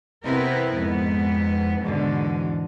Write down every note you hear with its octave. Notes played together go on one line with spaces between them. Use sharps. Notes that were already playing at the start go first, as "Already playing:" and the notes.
C3 B3 C4 E4 A#4 B4
F2 G#2 B3
E2 G#2 B2 D3